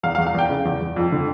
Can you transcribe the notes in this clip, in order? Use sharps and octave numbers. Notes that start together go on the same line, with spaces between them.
E2 F5
F5
E2
F5
E2 G5
C#3
E2
E2
F2
D3